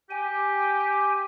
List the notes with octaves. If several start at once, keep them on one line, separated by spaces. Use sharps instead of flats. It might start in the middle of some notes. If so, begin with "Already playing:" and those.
G4 G#5